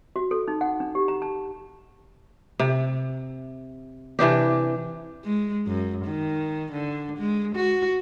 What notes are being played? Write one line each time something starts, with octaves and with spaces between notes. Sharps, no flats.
F#4
A4
D#4
F#5
D4
G4
A#5
A5
C3
C3 E3 D4 G4
G#3
F#2
D#3
D3
G#3
F#4